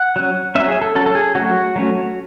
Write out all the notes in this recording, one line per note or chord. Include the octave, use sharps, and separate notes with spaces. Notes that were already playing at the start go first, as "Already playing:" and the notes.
Already playing: F#5
F#3 C#4
F#3 C#4 E5
G#4
A4
F#3 C#4 A4
A4
G#4
F#3 A3 C#4 F#4
F#3 A3 C#4